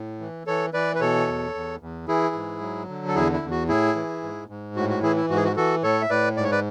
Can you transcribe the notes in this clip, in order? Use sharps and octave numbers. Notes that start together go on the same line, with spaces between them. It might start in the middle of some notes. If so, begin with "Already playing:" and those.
Already playing: A2
E3
E3 A4 C#5
E3 B4 D5
B4
B2 A4 C#5
E2
E2
E2
E3 E4 G#4
G#2
F#3
D3
A4
E2 E4 G#4
E4
E2
F#4
A2 E4 G#4
E3
G#2
G#2
A2 F#4
F#4
E3 E4 G#4
E4
G#2 F#4
G#4
F#4
E3 F#4 A4
A2 A4 C#5
E5
A2 B4 D5
G#2 D5
C#5
B4 D5